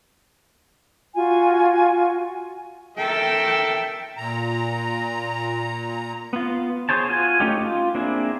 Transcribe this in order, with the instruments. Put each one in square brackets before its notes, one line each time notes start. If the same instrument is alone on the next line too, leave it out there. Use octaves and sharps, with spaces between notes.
[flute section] F4 F#4 G#5
[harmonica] A4 A#4 E5 [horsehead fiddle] G5
[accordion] A#2 A#5
[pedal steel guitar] B3 F4
G#4 C5 C#5 A5
F4 F#4 G#5
A3 C#4 D#4 G4
F4
A#3 C4 D4 E4 G#4